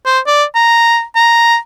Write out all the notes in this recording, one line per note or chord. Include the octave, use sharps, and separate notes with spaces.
C5
D5
A#5
A#5